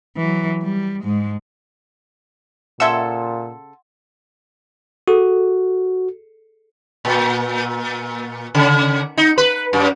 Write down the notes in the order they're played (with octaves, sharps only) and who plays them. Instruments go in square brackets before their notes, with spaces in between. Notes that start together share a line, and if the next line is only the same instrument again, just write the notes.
[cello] E3 F#3
G3
G#2 G#3
[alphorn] A#2 [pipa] C#3 A4 [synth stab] E5 E6 [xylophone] F#5 C6 G#6
[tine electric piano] F#4 [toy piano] G#4 A4
[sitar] A#2
C#3
D#4
B4
F#2